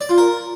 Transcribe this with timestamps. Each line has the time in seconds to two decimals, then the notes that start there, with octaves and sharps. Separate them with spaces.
0.01 D5
0.09 F4
0.18 A#4